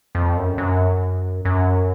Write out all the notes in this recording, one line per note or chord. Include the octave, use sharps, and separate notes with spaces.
F2
F#2
F#2
F#2